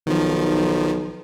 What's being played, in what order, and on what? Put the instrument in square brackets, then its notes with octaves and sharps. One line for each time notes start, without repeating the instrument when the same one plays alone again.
[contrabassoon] B1 [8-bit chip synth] D#3 F3